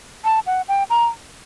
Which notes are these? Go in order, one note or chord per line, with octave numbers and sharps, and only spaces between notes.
A5
F#5
G5
A#5